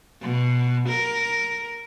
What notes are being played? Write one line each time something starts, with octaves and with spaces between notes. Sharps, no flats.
B2
A#4